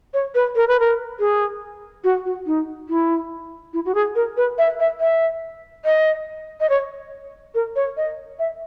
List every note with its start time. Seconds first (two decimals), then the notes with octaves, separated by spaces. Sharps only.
0.14 C#5
0.35 B4
0.56 A#4
0.68 B4
0.80 A#4
1.20 G#4
2.04 F#4
2.25 F#4
2.46 D#4
2.89 E4
3.73 E4
3.85 F#4
3.95 G#4
4.15 A#4
4.37 B4
4.58 E5
4.80 E5
5.00 E5
5.85 D#5
6.60 D#5
6.70 C#5
7.55 A#4
7.76 C#5
7.97 D#5
8.39 E5